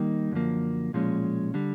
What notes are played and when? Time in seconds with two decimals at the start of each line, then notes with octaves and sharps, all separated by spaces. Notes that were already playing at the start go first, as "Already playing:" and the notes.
Already playing: D#3 G3 A#3 D#4
0.32 F#2 D3 F3 A#3
0.93 B1 A#2 F3 G#3 C#4
1.54 D3 G3